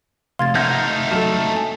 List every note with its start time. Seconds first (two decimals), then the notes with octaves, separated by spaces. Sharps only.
0.39 F1 F5 C6 G#6 A6
0.55 A3 D#4 E5 F#5 F6 G6 A#6
1.11 F#3 A4 D#5 A5 E7
1.56 G#5